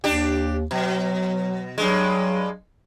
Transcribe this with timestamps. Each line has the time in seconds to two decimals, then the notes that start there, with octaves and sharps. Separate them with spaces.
0.04 D#2 D4 G4
0.71 B2 F#3
1.78 G2 F#3 G#3